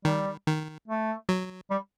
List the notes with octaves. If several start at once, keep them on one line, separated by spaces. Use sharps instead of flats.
D#3 G3
D#3
A3
F#3
G3